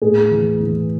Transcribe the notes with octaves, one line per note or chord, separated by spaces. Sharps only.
A2 G#4
E3
E3